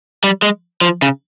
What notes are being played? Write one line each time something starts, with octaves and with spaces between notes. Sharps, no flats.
G3
G#3
F3
C#3